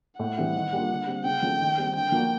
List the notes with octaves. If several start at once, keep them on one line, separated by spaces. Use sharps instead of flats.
A2 F#5
E3 G3 C4 E4
D#3
G3 A#3 D4 F4
D3
G3 C4
C#3 G5
F3 A3 C#4 F#4
D#3
G3 C4
D3 G5
F3 A#3 D4 F#4